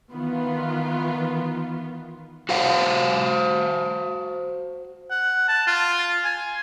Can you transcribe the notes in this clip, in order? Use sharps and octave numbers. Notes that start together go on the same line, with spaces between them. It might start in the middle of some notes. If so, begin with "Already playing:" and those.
D#3 E3 B3 F4
F#4 C5 F5 F#5
F#5
A5
F4
G#5